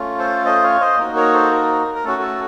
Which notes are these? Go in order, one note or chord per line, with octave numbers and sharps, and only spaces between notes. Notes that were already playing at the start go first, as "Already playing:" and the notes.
Already playing: A3 C#4 F4
A4 C5
C5 D#5
C#5 F5
C5 D#5
A#3 D#4 F#4 A#4
A#4 C#5
A4 C5
A#4
A#4
A3 C#4 F#4 A4
A4